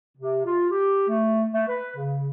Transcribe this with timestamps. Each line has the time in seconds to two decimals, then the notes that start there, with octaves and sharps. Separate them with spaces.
0.17 C3
0.45 F4
0.70 G4
1.08 A3
1.53 A3
1.68 B4
1.96 C#3